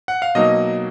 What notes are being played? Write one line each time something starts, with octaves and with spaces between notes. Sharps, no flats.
F#5
F5
B2 F#3 A#3 D#4 D#5